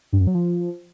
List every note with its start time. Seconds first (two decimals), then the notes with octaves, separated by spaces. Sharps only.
0.13 G2
0.20 F#2
0.27 F#3
0.34 F3